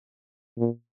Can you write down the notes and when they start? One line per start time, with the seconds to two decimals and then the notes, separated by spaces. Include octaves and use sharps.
0.58 A#2